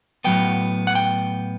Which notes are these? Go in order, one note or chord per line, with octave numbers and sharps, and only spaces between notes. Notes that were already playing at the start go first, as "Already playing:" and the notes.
A2 F#3 B3 G5
F#5
G5